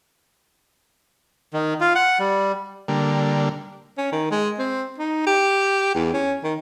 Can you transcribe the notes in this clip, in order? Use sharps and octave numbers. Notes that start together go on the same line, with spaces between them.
D#3
F4
F#5
G3
D3 G3 A#3
C#4
D#3
G#3
C4
D#4
G4
E2
C#4
D#3